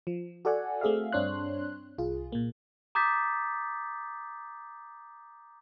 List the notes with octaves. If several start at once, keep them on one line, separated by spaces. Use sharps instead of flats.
F3
F#4 A4 D5 F#5 G#5
A3 C4 G#4 E5 F5
G2 C4 D4 C#5 C6 F#6
C2 F4 G#4
A#2 A#3
A#5 D6 D#6 G6 A6 B6